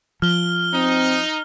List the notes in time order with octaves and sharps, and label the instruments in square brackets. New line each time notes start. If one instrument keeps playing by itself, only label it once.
[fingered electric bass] F3 [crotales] F6 G7
[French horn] C4 [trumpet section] D#4